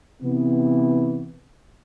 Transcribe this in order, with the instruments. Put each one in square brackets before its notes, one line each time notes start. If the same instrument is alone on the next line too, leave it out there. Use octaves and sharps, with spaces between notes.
[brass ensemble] C3 E3 B3